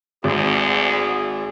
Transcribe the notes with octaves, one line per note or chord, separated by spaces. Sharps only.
G#1 D2 G#4